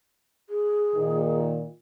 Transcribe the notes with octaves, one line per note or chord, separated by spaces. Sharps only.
G#4
A#2 D#3